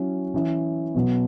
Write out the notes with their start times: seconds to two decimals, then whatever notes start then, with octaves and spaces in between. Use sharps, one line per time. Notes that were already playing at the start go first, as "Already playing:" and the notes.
Already playing: F#3 C#4 E4
0.34 E3 C#4 E4
0.95 B2 F#3 B3